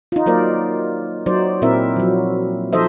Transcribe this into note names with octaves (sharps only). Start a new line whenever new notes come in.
D#4 F4
F#3 A#3 F4 A#4 C5 D5
F#3 D#4 C5 D5
A#2 C4 E4 A#4 E5
F3 F#3
F3 D#4 A4 C5 D#5 E5